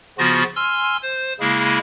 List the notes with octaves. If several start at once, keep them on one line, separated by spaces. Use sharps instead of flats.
C#3 F3 B3 F4 F#4 A#6
G#5 C6 E6 F6
C5
C#3 G#3 A#3 E4 G#4